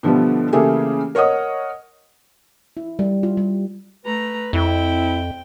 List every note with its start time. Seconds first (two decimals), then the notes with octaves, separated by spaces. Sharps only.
0.03 B2 D3 F3 G3 A3 B3
0.53 C#3 E3 A3 A#3 G4 G#4
1.15 A#4 C#5 D#5 F#5 D#6
2.77 E4
2.99 G3
3.23 F4
3.37 G3
4.05 A3 B4 A#5
4.53 F2 C4 E4 G5